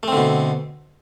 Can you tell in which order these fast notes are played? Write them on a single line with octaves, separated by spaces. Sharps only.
A3 C4 D3 B2